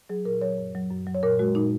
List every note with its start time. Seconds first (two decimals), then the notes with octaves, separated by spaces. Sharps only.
0.09 F#3 G#4
0.25 A#2 A#4
0.42 F#3 C#5
0.58 F#2
0.75 F#3
0.91 F#2
1.07 F#3
1.15 C#5
1.23 A#2 A#4
1.39 G#3 F#4
1.55 A#2 D#4